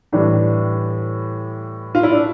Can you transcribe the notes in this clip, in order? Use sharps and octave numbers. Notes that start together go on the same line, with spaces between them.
A2 E3 G3 D4
F4
E4
D4